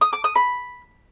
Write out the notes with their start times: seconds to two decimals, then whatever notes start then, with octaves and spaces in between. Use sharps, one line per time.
0.01 D#6
0.13 D6
0.24 D#6
0.35 B5